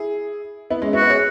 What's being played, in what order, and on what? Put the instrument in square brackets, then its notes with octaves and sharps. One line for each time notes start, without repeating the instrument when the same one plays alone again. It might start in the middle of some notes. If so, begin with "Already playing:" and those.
Already playing: [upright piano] E4 G#4
B3 E4
G#3 C#4
[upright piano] B3 E4 [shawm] F#4
[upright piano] B4 E5
G#4 C#5